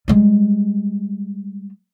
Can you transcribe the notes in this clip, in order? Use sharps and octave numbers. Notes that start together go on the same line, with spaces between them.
G3 G#3